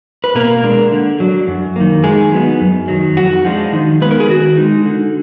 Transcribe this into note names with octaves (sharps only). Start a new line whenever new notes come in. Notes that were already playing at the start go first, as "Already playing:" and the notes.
B4
B2 A#3 A#4
G#3 D4
D3
F#3 D4
F#2
D#3 A#3
D#3 G#3 G#4
F#3 B3 D#4
F#2
D#3 F#3
F2 F#4
F3 G#3 D4
D#3
G#3 B3 B4
A#4
G#4
D#3 F#4
G#3 D#4
D3